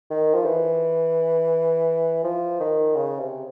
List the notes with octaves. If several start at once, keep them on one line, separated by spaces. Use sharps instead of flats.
D#3
F3
E3
F3
D#3
C#3
C3